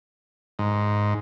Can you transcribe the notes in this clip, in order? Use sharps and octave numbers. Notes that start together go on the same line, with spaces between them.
G#2